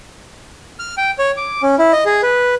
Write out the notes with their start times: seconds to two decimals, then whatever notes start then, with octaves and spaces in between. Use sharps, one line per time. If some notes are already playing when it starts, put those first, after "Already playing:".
0.79 F6
0.97 G5
1.19 C#5
1.37 D6
1.63 C#4
1.79 E4
1.93 D#5
2.06 G#4
2.23 B4